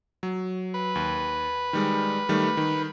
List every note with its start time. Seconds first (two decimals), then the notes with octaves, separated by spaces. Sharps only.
0.23 F#3
0.74 B4
0.95 D#2
1.73 D#3 G3 G#3
2.29 D#3 G3 A3
2.57 D#3